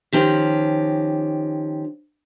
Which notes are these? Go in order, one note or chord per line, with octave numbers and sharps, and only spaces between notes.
D#3 F3 C#4 G4